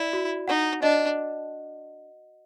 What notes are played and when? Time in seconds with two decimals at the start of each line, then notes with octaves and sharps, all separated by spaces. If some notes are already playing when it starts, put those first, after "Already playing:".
Already playing: E4 D5
0.13 F#4
0.48 D#4 F#5
0.83 D4 D#5